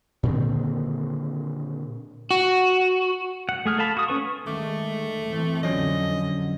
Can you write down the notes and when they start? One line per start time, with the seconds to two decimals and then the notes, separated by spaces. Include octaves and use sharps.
0.23 A#2 D3 D#3 C4
2.31 F#4
3.49 F#5
3.65 A3 G#4 F6
3.78 A4 F5 A5 B5
3.97 F#4 D#6
4.08 C#4 B4 C#6
4.47 D#3 G#3 A3 D6
5.29 E3 C4
5.63 F2 D3 F3 F#3 C#4 D#5